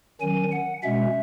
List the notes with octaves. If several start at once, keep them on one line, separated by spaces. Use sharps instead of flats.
D#3 F#3 C#4 G#5
F#5
B2 G#3 C#4 E5